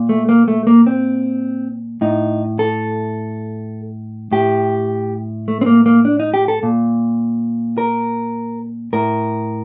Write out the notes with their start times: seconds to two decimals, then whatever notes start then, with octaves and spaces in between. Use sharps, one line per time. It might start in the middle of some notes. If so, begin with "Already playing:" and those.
Already playing: A#2
0.09 A3
0.29 A#3
0.48 A3
0.67 A#3
0.87 C4
2.01 A2 D#4
2.59 A4
4.32 A2 G4
5.48 A3
5.61 C4
5.66 A#3
5.86 A#3
6.05 D4
6.20 D#4
6.34 G4
6.48 A4
6.63 A#2
7.78 A#4
8.93 A2 A#4